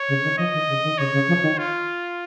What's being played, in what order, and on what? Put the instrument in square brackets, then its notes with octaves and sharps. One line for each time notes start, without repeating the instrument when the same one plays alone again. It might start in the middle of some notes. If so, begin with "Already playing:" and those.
Already playing: [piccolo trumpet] C#5
[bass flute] C#3
D#3
[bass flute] F3 [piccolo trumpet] D#5
[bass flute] D#3
C#3
D#3
[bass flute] C#3 [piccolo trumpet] C#5
[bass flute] C#3
F3
D#3
[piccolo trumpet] F4